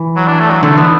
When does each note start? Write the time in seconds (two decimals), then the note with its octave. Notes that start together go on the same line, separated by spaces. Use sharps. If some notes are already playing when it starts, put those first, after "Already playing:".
Already playing: E3
0.16 F#3
0.27 D4
0.39 A3
0.50 F#3
0.63 D3 A3
0.77 E3 B3